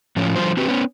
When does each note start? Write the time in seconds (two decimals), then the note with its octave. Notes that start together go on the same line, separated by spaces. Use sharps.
0.16 A2 F3 C#4
0.36 D3 F3 G3 C4 F4 C5
0.57 C4 F#4 G4 B4
0.69 B3 C#4